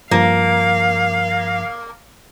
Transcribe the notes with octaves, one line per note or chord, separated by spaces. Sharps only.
G2 F3 A#3 F5